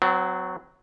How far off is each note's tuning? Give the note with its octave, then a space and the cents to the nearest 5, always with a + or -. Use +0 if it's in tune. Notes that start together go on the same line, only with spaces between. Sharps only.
F#3 +0 C4 -35